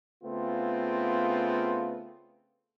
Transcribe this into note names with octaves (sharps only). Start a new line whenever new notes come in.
C#3 A3 B3 C4 F4